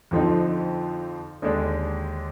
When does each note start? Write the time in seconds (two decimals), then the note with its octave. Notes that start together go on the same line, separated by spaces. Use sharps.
0.11 F2 D3 F3 C4 D#4
1.42 D#2 D3 G#3 D4